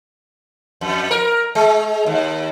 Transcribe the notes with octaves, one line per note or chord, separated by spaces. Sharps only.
F2
A#4
G#3
D#2